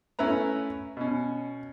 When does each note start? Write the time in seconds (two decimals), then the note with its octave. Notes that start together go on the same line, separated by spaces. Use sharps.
0.19 A3 C#4 E4 B4 A#5
0.97 B2 C#4